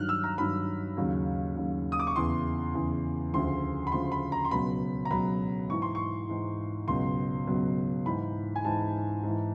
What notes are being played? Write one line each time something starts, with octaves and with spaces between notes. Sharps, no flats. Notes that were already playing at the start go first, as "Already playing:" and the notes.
Already playing: G2 D#3 F#3 F6 F#6
E6
A#5
G2 D#3 F#3 B5
D#2 C#3 F#3
D#2 C#3 F#3
D#6
D6
C#6
E2 C#3 E3 C6
E2 C#3 E3
D2 C#3 F3 C6
B5
D2 C#3 F3 C6
B5
A#5
C6
C#2 B2 F#3 B5
A#5
C#2 B2 F#3 B5
G#2 E3 C#6
C6
C#6
G#2 E3
C#2 B2 F#3 C6
C#2 B2 F#3
G#2 E3 B5
G#5
G#2 E3 A5
G#2 E3